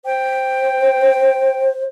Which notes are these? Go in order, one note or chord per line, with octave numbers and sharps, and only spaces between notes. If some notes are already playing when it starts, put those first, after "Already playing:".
C5 G5